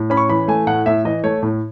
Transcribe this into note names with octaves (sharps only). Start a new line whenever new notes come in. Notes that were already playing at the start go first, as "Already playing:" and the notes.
Already playing: A2
C#4 B5
C#6
E3 B5
A3 G#5
A2 F#5
A2 E5
E3 D#5
A3 C#5
A2